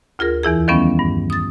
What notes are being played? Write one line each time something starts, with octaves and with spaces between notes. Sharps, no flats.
D2 F4 G#4 A#4
E2 E3 E4 G#4
D#3 F3 G3 B3 C#4
G2
D#6 A6